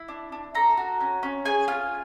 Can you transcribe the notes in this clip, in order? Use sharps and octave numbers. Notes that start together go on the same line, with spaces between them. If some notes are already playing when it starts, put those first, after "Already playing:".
Already playing: E4
D4
D4
A4 A#5
F#4
C#4
C#4
G#4 G#5
F4